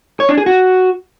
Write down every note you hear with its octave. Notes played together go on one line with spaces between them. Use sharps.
C#5
D4
G#4
F#4